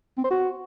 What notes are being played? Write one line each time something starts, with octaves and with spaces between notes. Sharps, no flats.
C4
C5
F#4